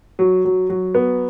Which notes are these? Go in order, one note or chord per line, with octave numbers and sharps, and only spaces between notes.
F#3
F#3
F#3
B3